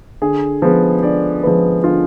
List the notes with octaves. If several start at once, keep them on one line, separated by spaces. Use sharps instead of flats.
D3 G#4
F3 G#3 B3
D3 D5
F3 G#3 B3 B4
D3 F4